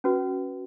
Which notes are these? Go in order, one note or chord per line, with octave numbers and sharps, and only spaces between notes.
C#4 F#4 B4